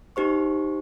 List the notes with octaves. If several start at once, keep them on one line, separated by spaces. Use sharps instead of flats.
D#4 G4 C5 C#6